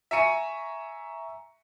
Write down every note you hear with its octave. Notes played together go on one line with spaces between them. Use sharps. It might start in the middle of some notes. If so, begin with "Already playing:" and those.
E5 G#5 A#5 C#6 C#7 D#7